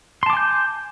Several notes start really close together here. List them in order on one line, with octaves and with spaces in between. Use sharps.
C6 A5 D6 G#5 G6